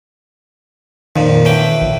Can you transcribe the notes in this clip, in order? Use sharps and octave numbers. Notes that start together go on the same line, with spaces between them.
F2 A#2 D#3
A2 E3 G5
A#1